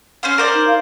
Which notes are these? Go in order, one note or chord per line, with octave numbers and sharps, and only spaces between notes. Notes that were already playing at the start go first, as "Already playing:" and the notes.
C#4 C5 F5
A#4 C5 D5
D#4
F5